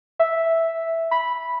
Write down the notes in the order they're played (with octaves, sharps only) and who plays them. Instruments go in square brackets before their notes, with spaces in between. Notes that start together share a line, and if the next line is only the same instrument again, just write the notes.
[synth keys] E5
B5